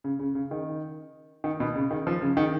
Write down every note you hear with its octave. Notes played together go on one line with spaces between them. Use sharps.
C#3
C#3
C#3
D#3
D#3
B2
C#3
D#3
F3
C#3
D#3